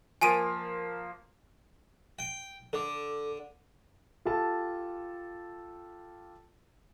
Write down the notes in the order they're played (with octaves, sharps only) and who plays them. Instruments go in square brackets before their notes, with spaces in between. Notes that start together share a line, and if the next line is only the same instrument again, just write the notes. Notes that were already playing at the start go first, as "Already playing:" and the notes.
[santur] F3 A#3 [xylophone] G#5 D7 D#7
[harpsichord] G5
[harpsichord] D3 [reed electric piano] A4 D6
[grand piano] F4 G4 A4 A5